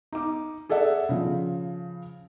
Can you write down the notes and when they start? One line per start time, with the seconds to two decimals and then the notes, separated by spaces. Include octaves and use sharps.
0.13 D#4 D6
0.69 G#4 A4 D5 E5 F#5
1.09 C#3 F3